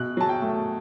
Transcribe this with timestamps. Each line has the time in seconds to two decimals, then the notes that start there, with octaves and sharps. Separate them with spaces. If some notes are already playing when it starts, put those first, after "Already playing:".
Already playing: B2 F#6
0.17 F#3 A5
0.29 G5
0.42 A3